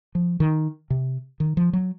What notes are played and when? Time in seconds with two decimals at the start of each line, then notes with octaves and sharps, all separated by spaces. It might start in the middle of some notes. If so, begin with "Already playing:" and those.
0.15 F3
0.40 D#3
0.90 C3
1.40 D#3
1.57 F3
1.73 F#3